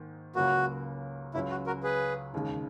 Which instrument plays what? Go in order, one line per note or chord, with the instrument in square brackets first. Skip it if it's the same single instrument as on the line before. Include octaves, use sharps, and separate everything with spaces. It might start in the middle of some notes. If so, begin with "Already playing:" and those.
Already playing: [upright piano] G#2 D#3 A#3
[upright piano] C#2 C#3 F#3 A#3 [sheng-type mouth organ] F#4
[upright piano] C#2 C#3 F#3 [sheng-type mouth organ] E4
[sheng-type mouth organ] F#4
F#4 A#4
G#4 B4
[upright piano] E1 D#2 C#3 G#3